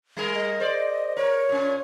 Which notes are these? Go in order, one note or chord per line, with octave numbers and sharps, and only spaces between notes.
G3 G#4 A#4
D#5
C5 D5
A#4 C#5
A#2 C#4